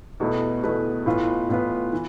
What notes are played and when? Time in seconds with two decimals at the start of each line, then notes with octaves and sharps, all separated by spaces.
0.20 E2 B2 A3 E4 B4
0.63 E2 B2 A3 E4 B4
1.06 A2 E3 B3 F4 B4
1.49 A2 E3 B3 F4 B4
1.93 E3